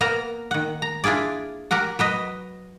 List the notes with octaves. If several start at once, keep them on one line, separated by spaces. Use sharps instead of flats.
A#3 B3 A#4 A#5
D#3 F#5
A#5
D4 E4 F4 G#4 D5
F#4 G4 A#4 F#5
F#3 B4 D#5